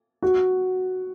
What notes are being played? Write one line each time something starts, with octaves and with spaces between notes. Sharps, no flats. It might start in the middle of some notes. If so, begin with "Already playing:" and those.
F#4